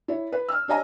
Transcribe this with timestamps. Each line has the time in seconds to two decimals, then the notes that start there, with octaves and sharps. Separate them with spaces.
0.08 E4 C#5
0.32 B4
0.49 E6 F6
0.68 D4 G4 C#5 D#5 G#5 A#5